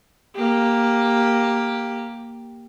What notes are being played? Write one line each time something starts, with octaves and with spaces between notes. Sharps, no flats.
A#3 G4